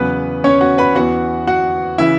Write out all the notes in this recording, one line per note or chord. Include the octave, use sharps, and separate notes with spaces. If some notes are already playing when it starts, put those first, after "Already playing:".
Already playing: E2 C#3 F#3 B3 B4
C#4 C#5
F#4 F#5
B4 B5
E2 E3 B3 F#4 F#5
F#4 F#5
C#3 E3 E4 E5